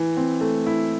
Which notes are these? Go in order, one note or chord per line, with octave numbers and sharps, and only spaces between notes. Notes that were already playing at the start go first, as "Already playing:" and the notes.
Already playing: E3
C4
A3
E4